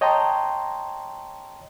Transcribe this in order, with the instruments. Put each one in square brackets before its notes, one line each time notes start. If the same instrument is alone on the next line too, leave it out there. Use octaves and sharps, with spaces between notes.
[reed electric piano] C#5 D#5 G5 A5 A#5 C6